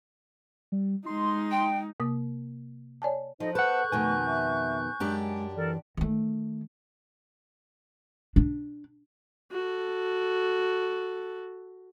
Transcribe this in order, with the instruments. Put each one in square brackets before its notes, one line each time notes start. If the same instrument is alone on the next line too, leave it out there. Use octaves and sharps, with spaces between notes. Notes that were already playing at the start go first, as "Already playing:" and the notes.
[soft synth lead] G3
[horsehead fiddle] G#3 D#4 [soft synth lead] C6
[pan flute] G5
[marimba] C3 A#3 D#6
C#5 D5 G#5 A5
[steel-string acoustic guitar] F3 [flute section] D#4 A4 D#5 [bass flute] C5
[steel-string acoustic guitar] A4 [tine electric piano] B4 F#5 [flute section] C#6 F#6 G6
[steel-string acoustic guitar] F2 B2 D#3 [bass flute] A3 [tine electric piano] G#5
[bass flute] E5
[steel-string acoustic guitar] F#2 D4 G4 [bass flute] G#3
[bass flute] E3 [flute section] A4 A#4 D5
[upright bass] D#3 A3
D4
[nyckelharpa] F#4 A4